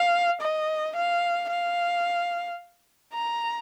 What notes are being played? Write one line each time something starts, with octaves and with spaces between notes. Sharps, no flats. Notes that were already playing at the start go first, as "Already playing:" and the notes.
Already playing: F5
D#5
F5
F5
A#5